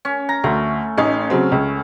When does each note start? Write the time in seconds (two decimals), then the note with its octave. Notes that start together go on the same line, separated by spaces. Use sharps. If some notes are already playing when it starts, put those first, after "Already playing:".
0.05 C#4
0.29 A#5
0.44 D2 A3
0.98 A1 C#4 D#4
1.30 C#3 F#3 C4
1.52 C#2